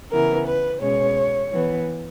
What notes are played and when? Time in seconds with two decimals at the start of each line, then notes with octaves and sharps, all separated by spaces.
0.11 C#3 E3 B3 A#4
0.46 B4
0.81 B2 G#3 C#4 C#5
1.51 E3 B3